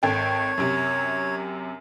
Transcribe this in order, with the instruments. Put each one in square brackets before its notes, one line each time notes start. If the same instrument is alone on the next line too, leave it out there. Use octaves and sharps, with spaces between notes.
[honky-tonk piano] G#1 A4 G5 [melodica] C#5
[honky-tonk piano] F#2 C3